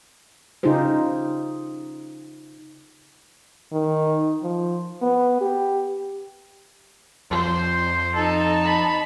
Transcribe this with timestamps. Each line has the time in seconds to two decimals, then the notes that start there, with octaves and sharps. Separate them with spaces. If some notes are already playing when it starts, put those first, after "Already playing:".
0.63 C#3 D#4 F4 G4 G#4 C5
3.72 D#3
4.43 F3
5.02 B3
5.41 G4
7.31 F2 F3 C5
8.16 D#4 A4 A5
8.64 B5